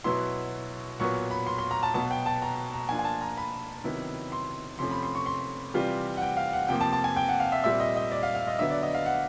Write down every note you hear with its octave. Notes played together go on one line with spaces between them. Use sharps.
B2 F#3 B3 E4 C6
A#2 F#3 B3 C#6
B5
C6
C6
A#5
A5
B2 F#3 B3 A5
G5
A5
A#5
A#5
F3 A#3 D4 F4 G#5
G#5
A5
A#5
B5
C3 D#3 F#3 B3 E4
C6
C3 F3 A3 C#4 C6
B5
C6
C#6
C6
C3 E3 G3 C4 F4
F#5
G5
F5
F#5
C3 F3 A#3 G5
A5
A5
G#5
G5
F#5
F5
E5
A#2 G3 C4 E5
D#5
D#5
D5
F5
F5
D#5
D3 F#3 B3 E5
D5
D#5
F5
F#5